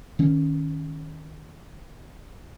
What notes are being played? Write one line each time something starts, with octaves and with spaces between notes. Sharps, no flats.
D#3 C#4